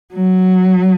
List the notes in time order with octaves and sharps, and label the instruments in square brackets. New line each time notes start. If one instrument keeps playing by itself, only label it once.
[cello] F#3